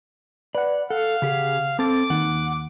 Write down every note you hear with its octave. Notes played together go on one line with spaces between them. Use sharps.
B4 D5 F#5
A4 F5 F#5
C#3 G4 G#4
C4 A4 D6 A6
D#2 F#5